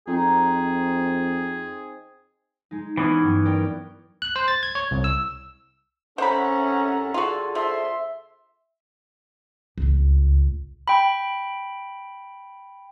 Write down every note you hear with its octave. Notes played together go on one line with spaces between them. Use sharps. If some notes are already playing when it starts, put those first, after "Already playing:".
F2 C4 D#4 G#4
G#3 D#4
E3 B3 C#4
G2 F#3
A#4 D5 G5
F#6
C5
A6
G#6
C#5
C2
E6
C2 C#4 A4 C5 E5 F#5 A#5 B5
D3 F4 F#4 G#4 A4
F3 E5 C6
D1 C#2
G5 B5